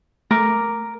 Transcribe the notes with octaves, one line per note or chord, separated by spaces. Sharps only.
A3 A#4 D6